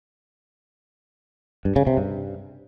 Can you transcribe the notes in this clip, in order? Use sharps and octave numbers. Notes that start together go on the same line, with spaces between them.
G2
C#3
C3
G2